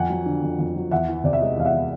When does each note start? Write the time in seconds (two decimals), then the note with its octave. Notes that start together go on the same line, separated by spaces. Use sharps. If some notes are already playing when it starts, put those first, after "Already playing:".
Already playing: F2 F#5 G#5
0.09 F#3
0.26 D3
0.42 F2
0.59 F2
0.75 F#3
0.91 E2 E5 F#5
1.08 E3
1.24 C3 D5
1.33 E5
1.41 G#3 D#5
1.57 E2 F5
1.65 E5 F#5
1.73 E3